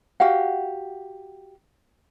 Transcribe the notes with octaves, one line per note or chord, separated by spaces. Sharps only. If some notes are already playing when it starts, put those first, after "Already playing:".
F#4 G4 F5 F#5